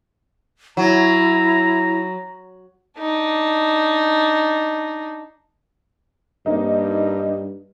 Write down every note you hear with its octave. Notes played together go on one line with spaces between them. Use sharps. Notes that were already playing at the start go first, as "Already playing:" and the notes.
F#3 E4 A#5
D4 D#4
G2 A#3 C4 D#4